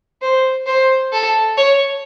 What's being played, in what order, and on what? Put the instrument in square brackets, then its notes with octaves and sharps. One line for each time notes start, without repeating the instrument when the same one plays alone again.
[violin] C5
C5
A4
C#5